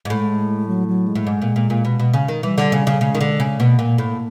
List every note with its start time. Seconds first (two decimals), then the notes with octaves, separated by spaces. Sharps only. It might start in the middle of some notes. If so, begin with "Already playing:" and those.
0.05 G#2
0.10 A2 G#3
0.68 F#3
0.88 F#3
1.07 G#3
1.15 A2
1.27 G#2
1.42 A#2
1.56 A#2
1.70 A#2
1.85 B2
2.00 B2
2.13 C#3
2.28 D#3
2.43 E3 G3
2.58 D3
2.72 C#3
2.87 C#3
3.01 C#3 G#3
3.15 D#3
3.21 D3
3.40 C#3
3.60 B2 A#3
3.79 A#2
3.98 A2